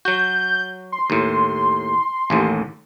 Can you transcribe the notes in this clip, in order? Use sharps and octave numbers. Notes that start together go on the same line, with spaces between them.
F#3 F#4 G6
C6
D#2 A2
A1 D#2 A2